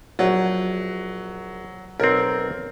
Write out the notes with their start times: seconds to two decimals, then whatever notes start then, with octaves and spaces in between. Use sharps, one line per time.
0.19 A#1 F#3
2.00 B1 C4 A#4